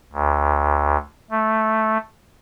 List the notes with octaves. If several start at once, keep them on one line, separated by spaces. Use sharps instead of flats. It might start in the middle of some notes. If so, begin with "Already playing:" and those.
D2
A3